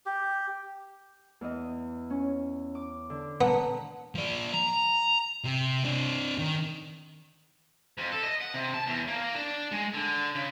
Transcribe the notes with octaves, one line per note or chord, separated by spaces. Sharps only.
G4
E2 D#5
C#4
D6
D3
B3 F#5 A5 A#5
F3 D5
A#5
C3
C4 D4
D#3
F2
A4
D#5
F#5
C3
A5
E2
A#3
D4
G#3
D3
C#3